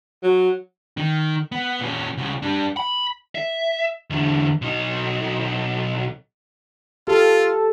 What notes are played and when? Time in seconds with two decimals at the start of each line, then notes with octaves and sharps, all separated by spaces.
0.23 F#3
0.97 D#3
1.52 B3
1.80 A#2 C#4
2.17 C2 C#3
2.42 G3 D4
2.77 B5
3.35 E5
4.10 E2 D3
4.62 B1 D#4
7.08 F4 G4 A4